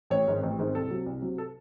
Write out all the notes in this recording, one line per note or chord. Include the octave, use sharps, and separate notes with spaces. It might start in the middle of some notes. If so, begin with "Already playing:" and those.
A1 C#5
G#2 D#3 G#3 C4
A1
G#2 D#3 G#3 C4
C2 A4
C3 F#3
C2
C3 F#3
A4